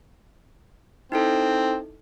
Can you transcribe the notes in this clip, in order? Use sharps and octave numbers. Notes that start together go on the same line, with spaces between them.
C4 D#4 E4 A4